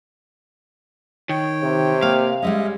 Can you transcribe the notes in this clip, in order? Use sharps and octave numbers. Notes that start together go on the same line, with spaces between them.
D#3 C#5 G5
C3
A#3 F5
G3 G#3 C#4 D#5 E5